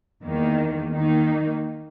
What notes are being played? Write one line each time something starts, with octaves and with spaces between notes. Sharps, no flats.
E2 D#3 A#3
D#3 A#3 D#4